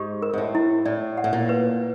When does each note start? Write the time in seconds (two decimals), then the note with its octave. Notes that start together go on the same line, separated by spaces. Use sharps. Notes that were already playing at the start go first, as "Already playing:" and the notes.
Already playing: G#2 G4
0.22 A#4
0.33 G#2
0.38 A2
0.55 E4
0.85 A2 D5
1.17 F#5
1.24 A2
1.33 A#2
1.49 B4